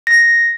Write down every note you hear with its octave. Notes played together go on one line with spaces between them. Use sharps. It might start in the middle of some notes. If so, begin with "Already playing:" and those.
A#6